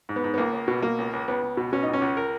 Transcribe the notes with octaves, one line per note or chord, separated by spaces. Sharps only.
G#2
B3
G#2
B3
C#2 A#3
C#2
B2
B2 A#3
C#2
C#2
C#2 B3
C#2
B2
B2 C#4
C#2 D#4
C#4
C#2
A#4